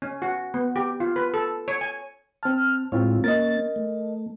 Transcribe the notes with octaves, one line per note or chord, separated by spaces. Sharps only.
C#4
F#4
B3
G4
F4
B4
A4
C#5
G#5
C4 A5 F6
A2 G#3 C4 E4 F4 C#5
A#3 C#4 A#4 D#5 A6
A3